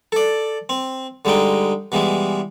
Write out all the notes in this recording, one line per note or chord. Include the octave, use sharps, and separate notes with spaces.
A4 D5
C4
D3 G3 G#3 D#4 G5
B2 E3 G3 G#3